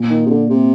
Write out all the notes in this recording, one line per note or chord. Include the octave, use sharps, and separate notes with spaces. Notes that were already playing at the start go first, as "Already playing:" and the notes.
Already playing: A#2
D#3
C3
D3
C3